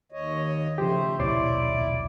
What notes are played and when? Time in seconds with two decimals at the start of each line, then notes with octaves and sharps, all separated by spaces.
0.12 D#2 C#5 D#5
0.78 C#3 F3 A3 G4 C5
1.20 D#1 B1 B2 E4 C#5 D5 C6